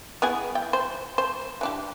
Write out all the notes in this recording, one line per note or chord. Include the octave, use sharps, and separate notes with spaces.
B3 E4 G#4
E4 G5
C5
C5
E3 D4 G4